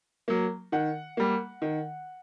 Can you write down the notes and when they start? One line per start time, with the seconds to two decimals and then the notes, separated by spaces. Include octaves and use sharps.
0.28 F#3 A#3
0.72 D#3 F#5
1.17 G3 A#3
1.62 D#3